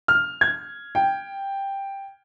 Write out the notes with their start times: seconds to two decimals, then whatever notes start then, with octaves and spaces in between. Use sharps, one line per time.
0.08 F6
0.41 G#6
0.95 G5